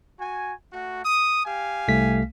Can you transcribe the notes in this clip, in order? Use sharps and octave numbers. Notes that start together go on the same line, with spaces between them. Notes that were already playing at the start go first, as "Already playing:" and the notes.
F#4 G#5
A3 F#4
D#6
G4 F5 G#5
C2 A3 B6